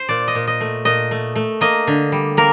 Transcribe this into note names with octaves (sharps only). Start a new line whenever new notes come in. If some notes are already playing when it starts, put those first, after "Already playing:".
Already playing: C5
A#2 D5
D#5
A#2
D#5
A3
A#2 D#5
A3
A3
A#3 D#5
D3
G3
A#3 A#4